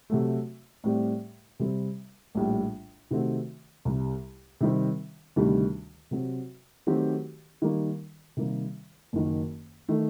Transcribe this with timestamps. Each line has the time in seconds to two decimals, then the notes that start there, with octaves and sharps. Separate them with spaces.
0.10 C3 F#3 A3
0.84 A2 G3 C4 G4 D5
1.60 C3 G3 C4
2.35 A#1 A2 G3
3.11 C3 D#3 A3 C4 F#4
3.85 C2 C3 G3
4.61 C3 D#3 G3 C4
5.36 D2 C3 D#3 G3
6.11 C3 F#3 C4
6.87 D#3 F#3 A3 C4 G4
7.62 D#3 G3 A#3
8.37 C3 D#3 G3 A#3
9.13 F#1 F#2 D#3 F#3
9.88 D#3 A3